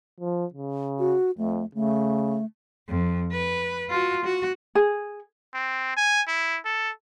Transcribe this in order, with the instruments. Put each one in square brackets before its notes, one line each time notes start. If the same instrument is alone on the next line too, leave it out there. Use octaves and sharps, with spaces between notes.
[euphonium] F3
C#3
[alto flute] F#4
[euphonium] F2 [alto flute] A3
[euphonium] C#3 [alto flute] A3
[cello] F2
B4
F4 F#4
F#4
[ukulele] G#4
[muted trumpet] C4
G#5
E4
A4